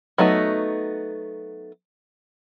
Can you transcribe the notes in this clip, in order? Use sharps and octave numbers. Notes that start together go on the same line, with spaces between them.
F#3 A3 B3 D#4